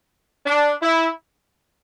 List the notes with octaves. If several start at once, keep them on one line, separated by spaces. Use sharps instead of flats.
D4
E4